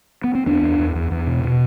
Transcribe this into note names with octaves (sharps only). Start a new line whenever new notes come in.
B3
C4
E2 B3 D4
E2
E2
E2
E2
B2
B2